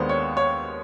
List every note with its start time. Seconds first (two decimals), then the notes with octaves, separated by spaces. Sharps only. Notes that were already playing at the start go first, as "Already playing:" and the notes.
Already playing: D#2 D#3 G#3 B3 D4 C5
0.09 C#5
0.37 C#5